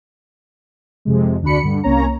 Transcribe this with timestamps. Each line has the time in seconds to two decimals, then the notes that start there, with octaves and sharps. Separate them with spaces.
1.05 F2 C3 G#3
1.42 D2 D4 F#4 B5 C#7
1.63 G2 D3
1.84 C2 A#3 C#4 C#5 A#5